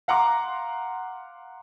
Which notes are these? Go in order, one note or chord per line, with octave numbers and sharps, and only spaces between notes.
F5 F#5 A#5 C6 D6